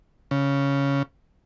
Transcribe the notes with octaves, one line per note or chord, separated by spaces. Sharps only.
C#3